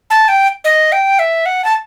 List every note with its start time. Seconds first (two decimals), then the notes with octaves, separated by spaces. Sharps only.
0.10 A5
0.28 G5
0.64 D#5
0.92 G5
1.19 E5
1.46 F#5
1.65 A5